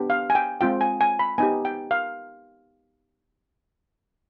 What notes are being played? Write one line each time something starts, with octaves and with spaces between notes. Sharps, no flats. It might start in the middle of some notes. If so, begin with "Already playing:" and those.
Already playing: B3 D4 G4
F5
G#5
G5
G#3 C4 F4 G5
G#5
G#5
B5
B3 D#4 G4 G#5
G5
F5